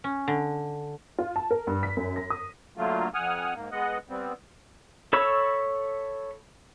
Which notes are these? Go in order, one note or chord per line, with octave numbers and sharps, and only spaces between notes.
C#4
D3
F4
A5
A#4
G2
B6
F#2
A#6
D#6
D3 F#3 A3 A#3 F4
F2 F#5 G#5 D#6 F6
G#2 A#3
G#3 B3 D#5 F#5
G3 B3 C4
A4 C#5 B5 C#6 E6